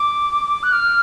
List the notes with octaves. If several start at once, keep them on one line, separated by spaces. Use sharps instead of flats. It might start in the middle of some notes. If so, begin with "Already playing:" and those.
Already playing: D6
F#6
F6